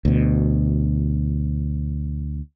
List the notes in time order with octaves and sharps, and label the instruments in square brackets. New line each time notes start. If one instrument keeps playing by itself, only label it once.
[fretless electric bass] D2 B2